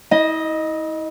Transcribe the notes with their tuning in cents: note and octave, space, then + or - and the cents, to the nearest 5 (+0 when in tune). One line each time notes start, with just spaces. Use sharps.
E4 -40 D#5 +0